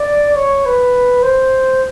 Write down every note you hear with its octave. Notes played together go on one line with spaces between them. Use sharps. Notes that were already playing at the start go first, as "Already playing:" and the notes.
Already playing: D5
C#5
B4
C5